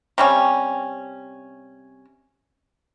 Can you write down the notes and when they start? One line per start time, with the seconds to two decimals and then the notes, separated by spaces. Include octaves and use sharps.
0.18 C3 G3 C#4